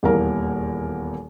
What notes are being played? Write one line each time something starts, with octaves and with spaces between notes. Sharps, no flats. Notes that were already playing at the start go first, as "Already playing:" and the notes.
D#1 E2 A#3 A#4